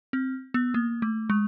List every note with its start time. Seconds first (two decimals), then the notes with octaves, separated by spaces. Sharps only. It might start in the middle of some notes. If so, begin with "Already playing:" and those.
0.13 C4
0.54 B3
0.74 A#3
1.02 A3
1.30 G#3